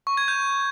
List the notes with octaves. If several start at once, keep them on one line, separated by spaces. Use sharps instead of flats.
C#6
G#6
G6